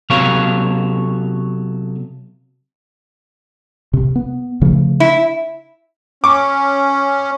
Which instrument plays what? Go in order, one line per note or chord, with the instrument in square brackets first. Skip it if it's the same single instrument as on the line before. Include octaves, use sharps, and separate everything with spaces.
[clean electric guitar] C3 F#3 B3 A4 C#5 F5
[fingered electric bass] C3
B3
C#3 F3 A3
[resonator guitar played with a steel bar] E4
[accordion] C#4 [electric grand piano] C#6 D6